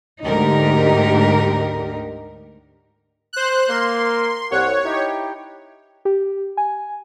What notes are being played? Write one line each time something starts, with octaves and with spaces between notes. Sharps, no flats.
D2 G#2 D3 D#4 G4 A#4
C5 F#6
A#3 C6
C2 C#5 F#5
D#4 E4 G4
G4
G#5